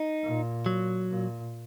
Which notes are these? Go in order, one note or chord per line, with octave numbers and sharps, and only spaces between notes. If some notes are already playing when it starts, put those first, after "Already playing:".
Already playing: D#4
A#2
F#3
A#2